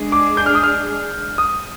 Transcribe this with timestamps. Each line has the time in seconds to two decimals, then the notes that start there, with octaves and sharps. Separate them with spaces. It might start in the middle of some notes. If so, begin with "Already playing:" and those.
Already playing: G#3 D4 G#4
0.12 D6
0.37 G6
0.46 F6
0.55 D#6
0.63 F6
1.38 D#6